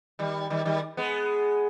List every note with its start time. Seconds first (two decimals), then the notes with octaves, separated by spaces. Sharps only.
0.19 D#3 G3
0.50 D#3 G3
0.65 D#3 G3
0.97 G#3 B3